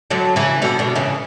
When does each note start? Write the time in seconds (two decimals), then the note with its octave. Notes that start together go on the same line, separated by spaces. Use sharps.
0.10 D3 F#3
0.36 C#3 E3
0.62 B2 D3
0.79 B2 D3
0.95 C#3 E3